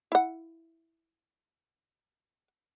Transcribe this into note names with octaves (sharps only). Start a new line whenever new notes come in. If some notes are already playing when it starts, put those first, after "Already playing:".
E4 F#5